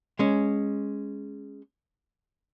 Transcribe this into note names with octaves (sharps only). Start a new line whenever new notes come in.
G#3 C#4